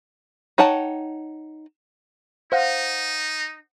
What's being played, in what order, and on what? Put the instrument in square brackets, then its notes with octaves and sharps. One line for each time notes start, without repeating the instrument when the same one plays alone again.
[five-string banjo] D#4 C#5 F#5 G5 A5
[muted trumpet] D#4 [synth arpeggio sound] C5 F5 F#5